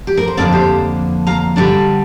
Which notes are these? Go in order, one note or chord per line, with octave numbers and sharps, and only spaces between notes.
G4
A#4
C5
F2 D3 A#3 D4 A#4 D5
G4 C5
F5 A#5
D3 G3 D4 D5 G5